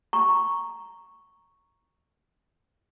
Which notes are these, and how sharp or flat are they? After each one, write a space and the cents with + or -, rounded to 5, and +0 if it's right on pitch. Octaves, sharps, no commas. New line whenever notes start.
A#5 +0 C#6 +0